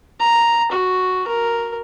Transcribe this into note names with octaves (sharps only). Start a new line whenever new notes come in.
A#5
F#4
A#4